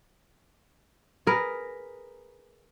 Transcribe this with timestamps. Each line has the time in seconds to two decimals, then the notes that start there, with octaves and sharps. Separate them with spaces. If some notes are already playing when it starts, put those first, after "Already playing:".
1.27 G#4 A#4 B4